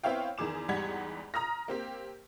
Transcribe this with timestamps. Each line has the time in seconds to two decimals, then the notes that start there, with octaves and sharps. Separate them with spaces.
0.04 B3 C4 E4 C#5 F5 G5
0.38 E2 D#3 G#4 D6 E7
0.68 E2 G#2 G3 F#5 G#6
1.34 A#5 D#6 F6 A#6
1.68 A#3 C4 G4